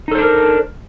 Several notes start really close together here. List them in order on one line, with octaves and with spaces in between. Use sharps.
D#4 A4 C5 D4 A#4